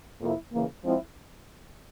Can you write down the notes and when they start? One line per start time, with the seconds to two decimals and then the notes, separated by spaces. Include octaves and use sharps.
0.21 F2 C3 F3 A#3 E4
0.53 C#3 E3 A#3
0.84 F3 G#3 C4 E4